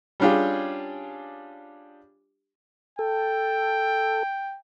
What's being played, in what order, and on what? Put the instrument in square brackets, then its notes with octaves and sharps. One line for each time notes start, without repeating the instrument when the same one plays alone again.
[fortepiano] G3 C#4 D4 F4 G4 G#4
[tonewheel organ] A4 [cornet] G5